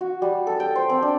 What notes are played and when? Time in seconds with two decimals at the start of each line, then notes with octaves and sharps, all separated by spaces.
0.01 F#4
0.22 G3
0.47 A4
0.60 G5
0.75 C5
0.89 C4
1.02 D4